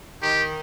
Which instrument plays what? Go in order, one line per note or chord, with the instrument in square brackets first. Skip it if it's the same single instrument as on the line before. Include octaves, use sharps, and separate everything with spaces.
[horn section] D#3 [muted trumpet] G4